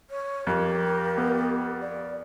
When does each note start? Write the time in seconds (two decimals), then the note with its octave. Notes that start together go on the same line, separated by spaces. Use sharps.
0.10 C#5
0.47 F2 G4 A#4
1.18 B3
1.81 D5